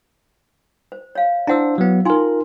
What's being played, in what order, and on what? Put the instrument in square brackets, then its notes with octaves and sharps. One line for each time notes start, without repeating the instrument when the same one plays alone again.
[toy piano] C5
C#5 F5
[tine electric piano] D4 C5 [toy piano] E4 F#5 E6
[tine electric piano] F#3 B3
[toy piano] D#4 G#5 C6 [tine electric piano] F4 A#4